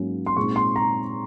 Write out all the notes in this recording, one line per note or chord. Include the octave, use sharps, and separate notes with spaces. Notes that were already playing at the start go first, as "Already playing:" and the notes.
Already playing: G#2 F#3 A#3 C#4
C6
A#2 G#3 C4 D#4 C#6
C6
A#5